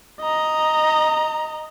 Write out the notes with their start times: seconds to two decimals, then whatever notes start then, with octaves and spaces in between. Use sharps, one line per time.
0.21 D#5 A#5